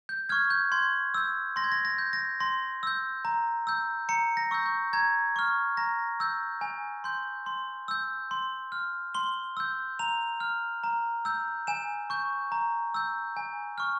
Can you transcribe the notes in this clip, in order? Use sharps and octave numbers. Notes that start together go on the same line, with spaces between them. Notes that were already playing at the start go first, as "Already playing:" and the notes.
G6
C#6 F6 G#6
G6
C6 G#6
E6 G6
C6 A#6
G#6
A#6
A#6
G6
A#6
C6 A#6
E6 G6
A#5
E6 G6
A#5 C#7
A#6
C#6 E6 G6
G6
A#5 G#6
C#6 F6
A#5 A#6
E6 G6
G#5
C6 G6
C6
E6 G6
C6
F6
C6 G7
E6 G6
A#5 F7
F6
A#5
E6 G6
G#5 E7
C#6 G6
A#5
E6 G6
G#5
C#6 F6